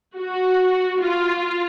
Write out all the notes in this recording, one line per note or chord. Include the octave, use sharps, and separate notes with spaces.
F#4
F4